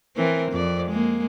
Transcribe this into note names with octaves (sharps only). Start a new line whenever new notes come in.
E3 C4 A#4
F2 D5
G#3 A#3